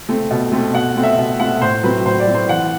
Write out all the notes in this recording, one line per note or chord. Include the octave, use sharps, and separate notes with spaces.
A3 C4
B2
A3 C4
B2 F#5
A3 C4
E5
B2
A3 C4 F#5
A2 C5
F#3 C4 B4
A2 C5
D5
F#3 C4
C5
E3 F#5